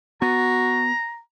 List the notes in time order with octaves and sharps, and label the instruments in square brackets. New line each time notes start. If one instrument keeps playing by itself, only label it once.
[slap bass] B3 [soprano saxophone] F#4 [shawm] A#5